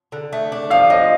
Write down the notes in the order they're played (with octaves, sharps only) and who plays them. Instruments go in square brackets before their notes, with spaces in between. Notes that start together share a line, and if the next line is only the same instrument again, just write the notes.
[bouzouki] D3
A3
D4
[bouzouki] F3 [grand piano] F5
[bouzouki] F3 [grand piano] D#5